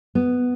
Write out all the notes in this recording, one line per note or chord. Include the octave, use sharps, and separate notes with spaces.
B3